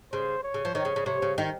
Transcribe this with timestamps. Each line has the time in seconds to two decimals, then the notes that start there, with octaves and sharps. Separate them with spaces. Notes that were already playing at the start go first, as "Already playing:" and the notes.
0.13 C#3 C5
0.44 C#5
0.54 C#3
0.65 F3
0.75 D#3 C#5
0.85 C#3
0.96 C#3
1.06 C3 C#5
1.22 C#3
1.38 D#3